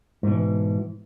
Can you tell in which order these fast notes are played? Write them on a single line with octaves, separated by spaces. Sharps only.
G#2 B2 E3